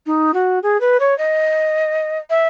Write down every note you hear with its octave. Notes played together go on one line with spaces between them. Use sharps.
D#4
F#4
G#4
B4
C#5
D#5
E5